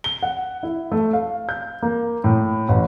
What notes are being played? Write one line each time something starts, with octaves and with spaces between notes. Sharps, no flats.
G7
F#5
E4
A3
F5
G6
A#3
A2
A1